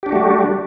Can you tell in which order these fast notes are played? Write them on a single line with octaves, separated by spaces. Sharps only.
G4 D4 F#4 A3 G3